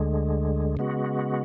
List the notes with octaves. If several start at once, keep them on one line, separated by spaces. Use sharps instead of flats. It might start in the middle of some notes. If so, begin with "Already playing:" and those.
Already playing: D2 D3 G#3
C#3 G#3 B3 F#4